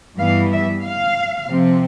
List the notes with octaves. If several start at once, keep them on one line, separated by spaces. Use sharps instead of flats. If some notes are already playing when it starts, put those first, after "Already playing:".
G2 E3 G3 B3 F5
E5
F5
C3 F3 C4